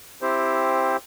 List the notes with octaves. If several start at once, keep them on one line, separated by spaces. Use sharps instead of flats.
C4 E4 G4 C5